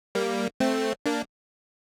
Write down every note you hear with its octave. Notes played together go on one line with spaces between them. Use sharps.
G3 A#3
A3 C4
A#3 D4